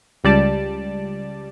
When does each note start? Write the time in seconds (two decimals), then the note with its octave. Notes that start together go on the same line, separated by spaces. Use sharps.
0.24 C#2 G3 D5 A5